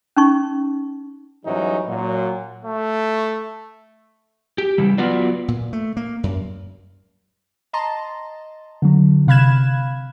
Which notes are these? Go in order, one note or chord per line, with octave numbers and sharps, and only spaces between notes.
C#4 D#4 C#6
G#2 E3 F#3 G3 C#4 D#4
A#2 F#3
A3
G4
C#3 E3 G3
F#3 B3 F4 F#4 B4 D5
A#2
A3
A#3
F#2
D#5 A5 A#5 C6
D3 F#3
C3 F5 B5 F#6 G#6 E7